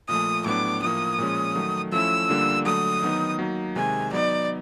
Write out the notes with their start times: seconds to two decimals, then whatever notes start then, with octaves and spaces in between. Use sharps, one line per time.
0.09 A#2 F3 A3 D#6
0.46 A2 F#3 B3 D4 D6
0.82 A2 F3 A#3 D#6
1.19 A#2 F3 G#3 C#4
1.56 D#3 F#3 A3
1.92 F3 A3 C#4 E4 E6
2.29 D3 G3 A#3 D4 F4
2.65 D3 F#3 A3 D#6
3.02 D#3 F#3 B3 D#4
3.39 F#3 A#3 D#4
3.76 C3 D#3 G#3 G#5
4.12 F#3 B3 D#4 D5